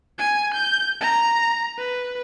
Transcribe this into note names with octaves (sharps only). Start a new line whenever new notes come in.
G#5
G6
A#5
B4